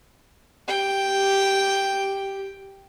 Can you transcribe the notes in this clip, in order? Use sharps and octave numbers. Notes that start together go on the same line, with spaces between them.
G4 G5